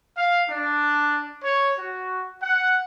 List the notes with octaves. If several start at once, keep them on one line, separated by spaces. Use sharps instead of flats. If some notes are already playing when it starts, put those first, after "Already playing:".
F5
D4
C#5
F#4
F#5